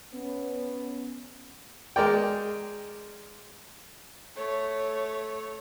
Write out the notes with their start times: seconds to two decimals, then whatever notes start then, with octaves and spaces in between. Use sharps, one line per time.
0.13 B3 C#4
1.96 G#3 A#4 D5 G5
4.36 A3 C#5